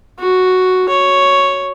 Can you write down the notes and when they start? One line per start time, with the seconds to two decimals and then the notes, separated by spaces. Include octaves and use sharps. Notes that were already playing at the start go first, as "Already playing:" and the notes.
0.19 F#4
0.89 C#5